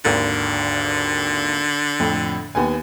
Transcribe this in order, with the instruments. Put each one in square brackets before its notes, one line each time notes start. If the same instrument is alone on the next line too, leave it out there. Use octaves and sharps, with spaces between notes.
[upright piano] G#1 D#2 A#4 [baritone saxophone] D3
[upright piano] F2 A2
D#2 B3 G#5